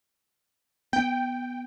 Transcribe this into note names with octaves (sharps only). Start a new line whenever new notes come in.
B3 G5